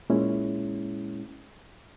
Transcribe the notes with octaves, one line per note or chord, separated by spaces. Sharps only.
A#2 G#3 C#4 E4